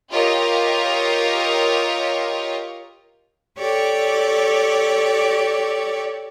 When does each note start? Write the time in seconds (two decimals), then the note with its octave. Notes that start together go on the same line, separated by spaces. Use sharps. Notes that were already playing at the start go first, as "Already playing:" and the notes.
0.11 F4 G4 A#4 C#5 D#5
3.58 G4 A4 C#5 D5